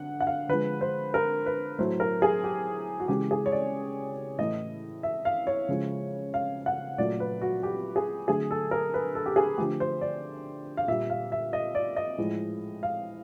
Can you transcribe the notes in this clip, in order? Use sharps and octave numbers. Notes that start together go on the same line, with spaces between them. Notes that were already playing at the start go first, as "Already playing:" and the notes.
Already playing: D3 F#5
F#5
F5
D3 F3 G#3 B4
C5
A#4
B4
A2 F#3 A3 C5
A#4
G#4
G4
F#4
C#3 E3 G#3 G4
G#4
C#5
D5
A2 E3 A3 D#5
E5
F5
C#5
C#3 F3 G#3
F5
F#5
A#2 F#3 A3 D5
B4
F#4
G4
G#4
D3 F#3 A3 G#4
A4
A#4
B4
A4
G4
G#4
D3 F3 A3 G4
C5
D5
F5
A#2 G3 E5
F5
E5
D#5
D5
D#5
A2 F3 G#3
F5